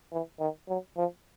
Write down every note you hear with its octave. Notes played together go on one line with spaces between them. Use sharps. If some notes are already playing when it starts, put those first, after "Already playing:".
E3
D#3
F#3
F3